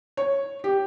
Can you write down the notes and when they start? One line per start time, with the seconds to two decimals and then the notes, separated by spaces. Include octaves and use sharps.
0.17 C#5
0.64 G4